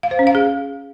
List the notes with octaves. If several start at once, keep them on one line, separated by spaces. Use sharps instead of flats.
F5
C5
C#4
F5
G#4